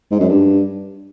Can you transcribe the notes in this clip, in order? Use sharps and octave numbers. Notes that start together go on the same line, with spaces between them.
G#2
F#2
G2